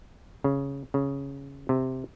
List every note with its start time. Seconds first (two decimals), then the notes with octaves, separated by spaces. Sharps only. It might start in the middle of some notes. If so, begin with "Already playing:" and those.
0.44 C#3
0.94 C#3
1.69 C3